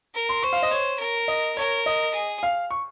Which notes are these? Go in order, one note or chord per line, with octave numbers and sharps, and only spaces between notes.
A#4
C6
C5 C#6
F5
D#5
C#5
A#4
D#5
A#4 C#5
D#5
G#4
F5
C#6